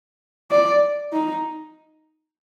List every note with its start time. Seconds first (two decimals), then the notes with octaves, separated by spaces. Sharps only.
0.51 D5
1.13 D#4